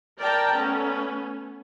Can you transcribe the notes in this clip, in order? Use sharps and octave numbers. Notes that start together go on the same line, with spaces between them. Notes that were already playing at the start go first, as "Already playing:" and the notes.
A#4 D5 G5 A5 A#5
A3 B3 C#4